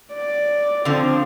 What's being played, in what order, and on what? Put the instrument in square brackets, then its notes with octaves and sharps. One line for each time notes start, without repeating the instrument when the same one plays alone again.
[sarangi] D5
[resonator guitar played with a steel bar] D3 F3 [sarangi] C4